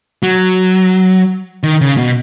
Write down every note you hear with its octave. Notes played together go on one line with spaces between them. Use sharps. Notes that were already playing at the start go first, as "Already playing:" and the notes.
F#3
D#3
C#3
B2